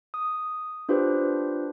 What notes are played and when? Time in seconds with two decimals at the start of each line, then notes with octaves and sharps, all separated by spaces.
0.14 D#6
0.89 D4 F4 G4 B4 C5